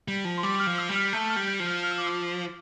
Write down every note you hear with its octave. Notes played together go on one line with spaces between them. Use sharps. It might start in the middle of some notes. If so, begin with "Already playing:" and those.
G3
F3
C6
G3 D6
F6
F3
E6
G3
F6
A3 G6
F6
G3
G6
F3
F6
F6
E6
D6
E6